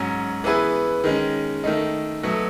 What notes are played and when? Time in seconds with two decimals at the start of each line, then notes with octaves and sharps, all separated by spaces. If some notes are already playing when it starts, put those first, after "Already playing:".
Already playing: G#2 F#3 C#4
0.44 E3 B3 E4 G#4 B4
1.04 D#3 G#3 C#4
1.64 D#3 A3 D#4
2.23 B2 F#3 A3